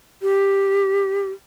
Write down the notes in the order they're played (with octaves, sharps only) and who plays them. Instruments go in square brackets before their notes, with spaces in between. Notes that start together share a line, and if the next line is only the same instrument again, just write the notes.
[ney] G4